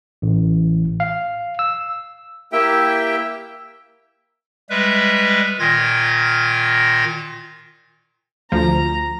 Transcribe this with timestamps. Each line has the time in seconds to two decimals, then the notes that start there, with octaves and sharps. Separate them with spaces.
0.22 A1
1.00 F5
1.59 E6
2.52 A#3 E4 G4 E5 G5
4.70 G3 G#3 B4 E5
5.59 A#2 D#3 F4 G#6 A#6
8.52 D2 F3 A#5